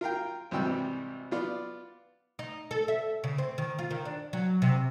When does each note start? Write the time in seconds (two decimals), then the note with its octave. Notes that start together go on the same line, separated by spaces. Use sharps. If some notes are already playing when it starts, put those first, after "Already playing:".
0.01 F4 A#4 F5 G5
0.51 G#1 C3 E3 G3 G5 E6
1.31 B3 F4 D5
2.39 D#4
2.71 A4
2.88 E5
3.24 C#3
3.38 C4
3.58 D#3
3.79 F4
3.91 D#3
4.05 D4
4.33 F#3
4.62 C3